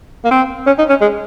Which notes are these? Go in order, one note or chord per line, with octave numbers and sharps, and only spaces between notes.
A#3
C4
C#4
D#4
C#4
G#3